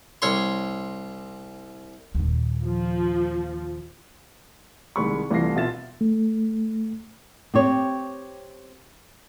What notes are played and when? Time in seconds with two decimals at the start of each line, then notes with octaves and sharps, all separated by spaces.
0.22 C2 C#5 C6
2.15 D#2 A#2
2.66 F3
4.96 C2 D#3 G#3 B5 C#6
5.31 C2 E3 A3 F4 A#6 C7
5.56 B2 F4 E5 A6 E7
6.01 A3
7.54 C4 G4 C#5